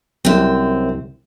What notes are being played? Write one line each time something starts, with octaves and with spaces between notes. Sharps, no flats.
C2 F#2 C4